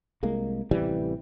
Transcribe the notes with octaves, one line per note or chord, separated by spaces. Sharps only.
C2 G#3 A#3
A1 C3 E3 G3